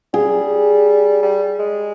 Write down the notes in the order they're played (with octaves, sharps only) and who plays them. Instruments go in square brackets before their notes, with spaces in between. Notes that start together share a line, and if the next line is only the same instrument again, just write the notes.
[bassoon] G3 [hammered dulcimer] G#4
[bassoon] G3
G#3